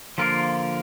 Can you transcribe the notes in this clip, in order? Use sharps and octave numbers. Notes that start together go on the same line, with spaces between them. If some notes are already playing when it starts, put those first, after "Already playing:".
D3 F3 A#3 F4 A#4